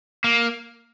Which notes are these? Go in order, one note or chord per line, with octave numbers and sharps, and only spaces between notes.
A#3